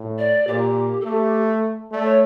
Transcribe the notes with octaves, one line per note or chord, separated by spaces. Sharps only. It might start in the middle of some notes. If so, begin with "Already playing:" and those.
Already playing: A2
D5
A#2 G4
A4
A3 G4
A3 D5
C#5